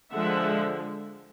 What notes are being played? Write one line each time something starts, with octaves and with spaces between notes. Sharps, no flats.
D3 F3 G#3 E5 F#5